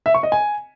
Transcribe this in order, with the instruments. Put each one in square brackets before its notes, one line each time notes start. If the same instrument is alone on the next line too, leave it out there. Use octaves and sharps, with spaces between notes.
[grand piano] E5
C#6
D#5
G#5